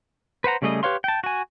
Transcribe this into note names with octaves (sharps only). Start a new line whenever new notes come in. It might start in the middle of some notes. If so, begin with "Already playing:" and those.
B4 C5 F#5 A#5
C#3 G3 A3 G#4 D#5
G4 B4 C#5 F5 C6
G5 A5
F#4 G#5